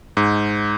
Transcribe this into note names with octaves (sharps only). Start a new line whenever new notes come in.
G#2